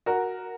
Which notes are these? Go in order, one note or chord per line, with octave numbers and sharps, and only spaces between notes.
F#4 A#4